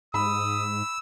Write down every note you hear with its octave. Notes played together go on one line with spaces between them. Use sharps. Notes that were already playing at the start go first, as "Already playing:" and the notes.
G#2 B5 D#6 E6